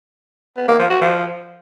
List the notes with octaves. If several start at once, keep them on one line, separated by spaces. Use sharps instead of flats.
B3
A#3
F3
F#4
F3